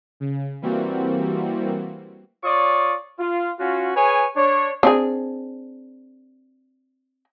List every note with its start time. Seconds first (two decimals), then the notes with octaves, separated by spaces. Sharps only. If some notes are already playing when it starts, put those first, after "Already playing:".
0.20 C#3
0.62 E3 G3 A#3 C4 F#4
2.44 F4 C#5 D5 C#6 D#6
3.19 F4
3.59 C#4 F4 F#4
3.96 G#4 B4 C#5 G#5
4.36 D4 C#5
4.83 C4 D4 G#4